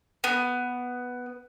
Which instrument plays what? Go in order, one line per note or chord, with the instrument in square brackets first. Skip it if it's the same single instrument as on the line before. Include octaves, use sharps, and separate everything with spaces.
[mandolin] B3